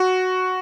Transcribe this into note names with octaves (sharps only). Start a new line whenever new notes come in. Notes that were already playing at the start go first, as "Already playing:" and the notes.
Already playing: F#4